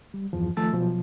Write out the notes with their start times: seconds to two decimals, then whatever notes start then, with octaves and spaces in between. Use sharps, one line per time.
0.14 G3
0.33 E2 G2 F3
0.57 D#3 F3 A3 A5 E6 A6
0.73 B2 F3 F#3